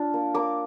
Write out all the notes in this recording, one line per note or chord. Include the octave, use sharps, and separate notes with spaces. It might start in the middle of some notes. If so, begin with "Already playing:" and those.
Already playing: D4 F4
A#3
A#3 D6